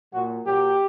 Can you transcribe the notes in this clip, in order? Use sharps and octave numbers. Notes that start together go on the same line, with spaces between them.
A#2 F#3 F#4
A#2 F#3 G4